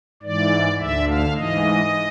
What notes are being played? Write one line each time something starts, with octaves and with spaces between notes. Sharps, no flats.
G#2 E3 D5
D2 D3 E5
F5
G#2 E3 D#5